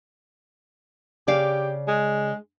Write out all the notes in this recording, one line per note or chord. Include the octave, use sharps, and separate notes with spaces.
C#3 G4 D5 F5
G#3